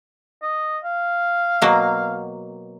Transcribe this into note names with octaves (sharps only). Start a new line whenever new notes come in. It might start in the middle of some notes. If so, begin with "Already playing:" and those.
D#5
F5
B2 F#3 A#3